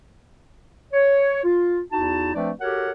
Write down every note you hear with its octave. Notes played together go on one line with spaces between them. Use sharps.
C#5
F4
E2 D#4 E4 F#4 A5
F3 A3 C4 D4 B4 D5
F#4 G4 A4 A#4 C#5 F#5